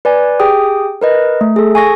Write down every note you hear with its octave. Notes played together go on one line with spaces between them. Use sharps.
B4 D5 G#5
G4 G#4 G5 D#6
A#4 B4 D#5
A3
G#4 A4
G#5 C#6 A#6